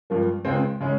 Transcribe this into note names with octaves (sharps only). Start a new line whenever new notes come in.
G2 F3 A#3
C#2 C#3 G#3 C4
C#3 G#3 C#4